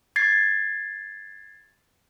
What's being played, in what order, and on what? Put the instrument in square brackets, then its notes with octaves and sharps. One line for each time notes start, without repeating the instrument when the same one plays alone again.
[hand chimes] G#6 A6 C7